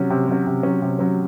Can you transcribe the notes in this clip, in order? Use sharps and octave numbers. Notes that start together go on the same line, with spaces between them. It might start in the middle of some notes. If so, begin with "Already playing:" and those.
Already playing: C3 F#3 C#4
C3
F#3 C#4
C3
F#3 C#4
C3
F#3 C#4